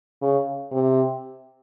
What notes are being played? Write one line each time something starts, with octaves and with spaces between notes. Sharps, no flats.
C#3
C3